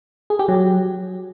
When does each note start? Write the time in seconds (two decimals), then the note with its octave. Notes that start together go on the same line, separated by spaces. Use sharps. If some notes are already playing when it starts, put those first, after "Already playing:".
0.30 G#4
0.39 G4
0.48 F#3